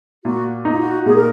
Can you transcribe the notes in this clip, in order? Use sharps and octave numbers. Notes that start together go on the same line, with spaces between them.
A#2 F#4
D#4
F4
F#4
A#2 G#4
A#4